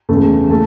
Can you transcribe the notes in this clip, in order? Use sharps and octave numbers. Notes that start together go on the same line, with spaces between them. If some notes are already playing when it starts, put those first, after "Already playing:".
E2 C#3 E3 A3
A3 A5